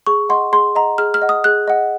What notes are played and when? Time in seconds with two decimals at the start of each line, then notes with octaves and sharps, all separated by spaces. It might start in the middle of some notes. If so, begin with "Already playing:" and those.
0.07 G#4 C#6
0.29 D#5 F#5 C6
0.53 G#4 C6
0.76 D#5 F#5 A#5
0.98 G#4 F6
1.14 F6
1.22 D#5 F#5
1.29 D#6
1.44 G#4 F#6
1.68 D#5 F#5